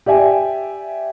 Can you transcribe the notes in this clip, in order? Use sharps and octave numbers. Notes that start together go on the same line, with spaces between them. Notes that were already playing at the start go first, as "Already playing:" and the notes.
G4 D5 E5 G#5